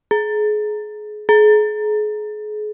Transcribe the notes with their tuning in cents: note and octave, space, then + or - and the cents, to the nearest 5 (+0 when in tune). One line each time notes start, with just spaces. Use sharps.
G#4 +30
G#4 +35